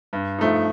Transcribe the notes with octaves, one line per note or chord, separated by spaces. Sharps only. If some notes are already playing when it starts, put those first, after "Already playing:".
G2
F3 A3 D#4